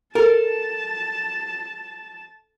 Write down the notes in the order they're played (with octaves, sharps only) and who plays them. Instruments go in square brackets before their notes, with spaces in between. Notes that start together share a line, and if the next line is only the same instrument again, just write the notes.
[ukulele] A4 [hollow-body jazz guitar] A#4 [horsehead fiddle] A5